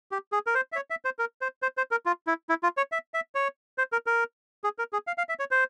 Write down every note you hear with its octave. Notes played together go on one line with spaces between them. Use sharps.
G4
G#4
A#4
C5
E5
C#5
E5
C5
A#4
C5
C5
C5
A#4
F4
E4
E4
F4
C#5
E5
E5
C#5
C5
A#4
A#4
G#4
A#4
G#4
F5
F5
E5
C#5
C5